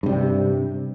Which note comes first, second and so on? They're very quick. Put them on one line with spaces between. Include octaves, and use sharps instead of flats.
G2 C3 G3